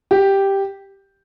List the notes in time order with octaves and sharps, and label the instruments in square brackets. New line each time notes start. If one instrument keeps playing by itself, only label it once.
[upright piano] G4